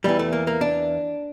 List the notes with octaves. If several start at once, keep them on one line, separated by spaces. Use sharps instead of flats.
E2 E3 G3
A3
A#3
A#3
D4